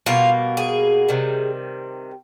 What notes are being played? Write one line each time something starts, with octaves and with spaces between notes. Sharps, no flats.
B2 G3 A#3 F4
G#4
C3 D#3 G3